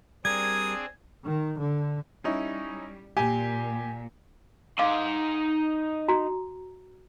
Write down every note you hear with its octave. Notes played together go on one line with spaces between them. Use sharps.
G3 C4 D4 G#4 A#4 D#6 G#6
D#3
D3
G3 C#4 D#4 E4
A#2 G4 G#5
D#4 F5 C6 D6
F#4 A#5